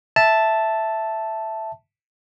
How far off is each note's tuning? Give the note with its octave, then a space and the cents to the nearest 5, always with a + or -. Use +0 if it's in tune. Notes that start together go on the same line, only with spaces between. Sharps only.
E5 +0 A5 +0